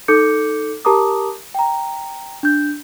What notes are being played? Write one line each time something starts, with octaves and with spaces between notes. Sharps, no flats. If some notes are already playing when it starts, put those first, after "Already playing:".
D#4 A4 D6 G6 C#7
G4 A#4 A5 A#5 D6 D#6
G5 A#5
D4 G6